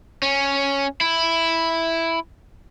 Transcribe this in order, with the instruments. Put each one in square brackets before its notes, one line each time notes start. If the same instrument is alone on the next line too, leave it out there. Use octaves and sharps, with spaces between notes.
[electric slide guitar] C#4
E4